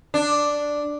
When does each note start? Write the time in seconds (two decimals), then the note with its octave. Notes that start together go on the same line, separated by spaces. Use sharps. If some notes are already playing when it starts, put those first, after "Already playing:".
0.14 D4